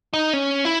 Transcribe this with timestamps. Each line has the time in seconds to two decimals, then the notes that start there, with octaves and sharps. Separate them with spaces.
0.13 D#4
0.33 C#4
0.65 E4